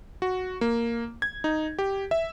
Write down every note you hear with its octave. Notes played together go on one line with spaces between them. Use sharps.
F#4
A#3
G#6
D#4
G4
E5